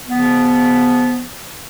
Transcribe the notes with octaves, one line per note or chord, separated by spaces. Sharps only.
C#3 F3 B3